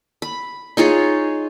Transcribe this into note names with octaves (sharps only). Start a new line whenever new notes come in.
B5
D#4 F4 G#4 C#5